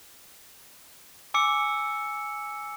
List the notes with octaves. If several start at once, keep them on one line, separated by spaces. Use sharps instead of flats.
G#5 D6 E6 C#7